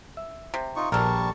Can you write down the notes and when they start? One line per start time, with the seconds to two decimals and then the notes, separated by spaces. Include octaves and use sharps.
0.17 E5
0.54 C3
0.76 D#4 F4 C#6
0.92 A#1 G3 A4 A#4 A5 C#6